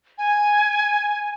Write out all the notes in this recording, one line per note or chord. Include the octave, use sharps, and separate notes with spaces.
G#5